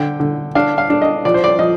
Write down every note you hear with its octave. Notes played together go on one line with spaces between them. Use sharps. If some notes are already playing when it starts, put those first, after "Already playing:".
Already playing: D3 G5
D3
D4 F5
F5
D4
D#5
F3 D5
C5
D5
F3 D#5